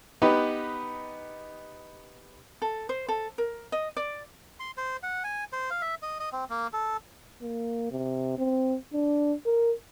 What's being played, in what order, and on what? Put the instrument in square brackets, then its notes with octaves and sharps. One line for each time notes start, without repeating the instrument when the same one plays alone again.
[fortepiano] B3 D#4 G4 B4
[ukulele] A4
C5
A4
A#4
D#5
D5
[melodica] C6
C5
F#5
G#5
C5
F5
E5
D#5
D#5
C4
A#3
A4
[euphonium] A#3
C3
C4
D4
A#4